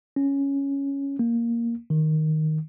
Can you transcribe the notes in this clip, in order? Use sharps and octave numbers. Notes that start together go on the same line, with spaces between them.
C#4
A#3
D#3